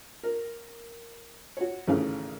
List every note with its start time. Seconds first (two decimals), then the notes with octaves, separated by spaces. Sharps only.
0.23 A#4
1.57 F#4 C#5
1.87 G#1 C#3 E3 A3 C#4 F5